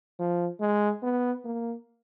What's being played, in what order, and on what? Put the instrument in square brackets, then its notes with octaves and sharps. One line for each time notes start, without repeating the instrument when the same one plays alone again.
[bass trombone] F3
G#3
B3
A#3